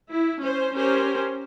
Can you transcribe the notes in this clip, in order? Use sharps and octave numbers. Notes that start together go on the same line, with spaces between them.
E4
C#4 C5
C#4 G4 A#4 C5